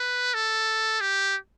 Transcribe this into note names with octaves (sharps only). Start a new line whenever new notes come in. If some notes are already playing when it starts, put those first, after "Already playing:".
Already playing: B4
A4
G4